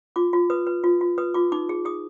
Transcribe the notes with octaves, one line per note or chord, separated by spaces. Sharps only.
F4 D6
F4
B4 D#6
B4
F4
F4
B4 D#6
F4 D6
D#4 D6
G#4
G#4 D#6